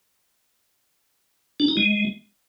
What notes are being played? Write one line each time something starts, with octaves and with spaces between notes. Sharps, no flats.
D4
D#4
G#3